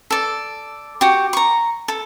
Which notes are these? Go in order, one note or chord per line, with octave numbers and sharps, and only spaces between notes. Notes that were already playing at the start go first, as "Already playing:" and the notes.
A4 D5
F#4 G4
A#5 C#6
A4